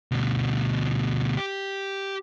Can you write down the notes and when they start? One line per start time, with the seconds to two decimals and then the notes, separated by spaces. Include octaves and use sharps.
0.12 D2 B2
1.37 G4